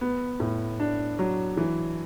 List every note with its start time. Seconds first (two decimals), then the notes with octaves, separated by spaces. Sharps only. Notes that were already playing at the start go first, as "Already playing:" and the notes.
0.01 B3
0.40 A2
0.80 D4
1.19 F#3
1.57 E3